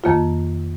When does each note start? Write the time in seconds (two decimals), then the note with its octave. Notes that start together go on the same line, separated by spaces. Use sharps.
0.04 F2 D#3 A#3 F4